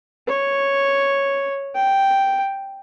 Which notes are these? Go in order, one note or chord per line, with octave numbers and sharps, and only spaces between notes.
C#5
G5